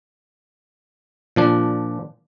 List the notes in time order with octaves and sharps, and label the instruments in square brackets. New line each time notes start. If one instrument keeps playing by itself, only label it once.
[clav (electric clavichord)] A#2 F3 D4